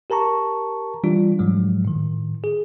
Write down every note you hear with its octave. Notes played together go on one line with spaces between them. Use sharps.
G4 A#4 A5 A#5 C#6
E3 G3 D4 F4
G#2 F3 F#3 G#3
A2 D#3
G#4